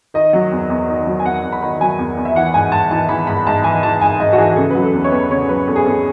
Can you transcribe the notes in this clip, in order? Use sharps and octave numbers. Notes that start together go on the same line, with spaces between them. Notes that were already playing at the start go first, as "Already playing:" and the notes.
D#3 D#5
F#3
E2
E2
D#3
F#3
G#5
E2 F#5
E2
B5
D#3
F#3 G#5
E2
E2
E5
E3 F#5
G#2 G#5
G#2 A5
E3 A5
E3 B5
G#2 B5
G#2 A5
E3 G#5
E3 A5
G#2 G#5
G#2 D#5
F#4
E3 G#4
C#3 A4
F#3 B4
A4
E2
C#5
E2 B4
C#3 C#5
F#3 B4
E2 A4
G#4
E2 A4